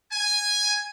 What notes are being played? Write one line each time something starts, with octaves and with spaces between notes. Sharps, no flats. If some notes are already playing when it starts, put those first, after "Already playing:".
G#5